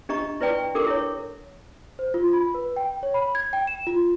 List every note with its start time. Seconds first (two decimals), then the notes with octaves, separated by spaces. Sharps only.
0.09 D4 G4 D#5 A#5 C#6
0.41 E4 B4 D5 G5 C6
0.75 D4 G4 A4 A#4 D6
0.87 E4 C#5
1.99 C5
2.14 F4
2.33 B5
2.54 B4
2.76 G5
3.03 C#5
3.14 B5
3.35 G#6
3.53 G5
3.67 E7
3.87 F4